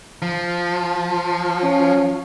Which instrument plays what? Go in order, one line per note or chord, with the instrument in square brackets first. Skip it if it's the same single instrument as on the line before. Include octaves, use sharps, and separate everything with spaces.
[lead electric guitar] F3
[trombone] C#4